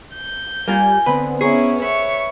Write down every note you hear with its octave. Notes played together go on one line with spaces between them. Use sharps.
G6
G3 A#3 F4 G#5
D3 B3 C4 B4
C#4 E4 G#4 C#5 A#5 C#6
B4 C#5 E5 C#6